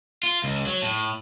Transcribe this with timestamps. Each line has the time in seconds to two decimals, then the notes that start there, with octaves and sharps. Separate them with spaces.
0.23 F4
0.44 C#2
0.67 F#3
0.82 A2